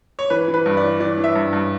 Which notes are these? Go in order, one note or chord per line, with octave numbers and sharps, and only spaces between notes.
C#5
E3 B4
E3
B4
G2
D5
E3
E3 D5
E3
E5
G2
G2